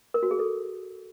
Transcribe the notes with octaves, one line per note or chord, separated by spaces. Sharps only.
A#4
F#4
G#4
A4